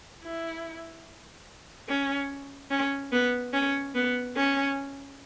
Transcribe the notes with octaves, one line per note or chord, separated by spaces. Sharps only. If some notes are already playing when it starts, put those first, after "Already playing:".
E4
C#4
C#4
B3
C#4
B3
C#4